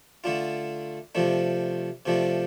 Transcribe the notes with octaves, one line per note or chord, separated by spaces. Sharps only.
D3 A3 D4 F4
C3 F3 A3 D4
C3 F3 A3 D4